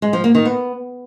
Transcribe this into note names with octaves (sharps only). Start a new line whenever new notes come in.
G#3
F3
A#3
D#3
B3